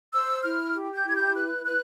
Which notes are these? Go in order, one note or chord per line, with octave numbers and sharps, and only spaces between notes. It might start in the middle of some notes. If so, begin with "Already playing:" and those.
C5 E6
E4 F6
G4
G6
E4 G#6
G6
B4 F#6
B4 F#6